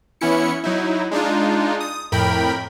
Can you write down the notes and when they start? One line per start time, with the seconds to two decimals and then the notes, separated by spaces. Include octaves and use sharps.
0.21 E3 B3 C#4 E4 C#7
0.64 F#3 D#4 E4
1.11 G#3 D4 D#4 F4
1.80 D#6
2.12 F2 A2 A#4 G5 B5